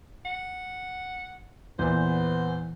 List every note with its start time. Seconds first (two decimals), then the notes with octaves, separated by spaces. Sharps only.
0.25 F#5
1.79 E2 A#2 E3 B3 C5